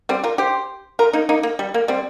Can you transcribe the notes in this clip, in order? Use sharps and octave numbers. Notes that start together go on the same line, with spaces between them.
G3 C4
F4 A#4
G4 C5
F4 A#4
A#3 D#4
A#3 D#4
A#3
G3
A#3
G3 C4